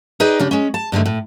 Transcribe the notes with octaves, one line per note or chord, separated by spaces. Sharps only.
D#4 G#4 B4 D5 D#5 G5
C#3 D4 G4
G#3 C#4
A5
G2 D3 D#3 A3
A2